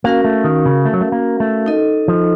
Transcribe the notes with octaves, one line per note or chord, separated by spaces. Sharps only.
A#3 C#4 F#4 A#4 F5
A3
D#3
C#3
A3
F#3
A3
A#3
A3
D#4 A4 D#5
F3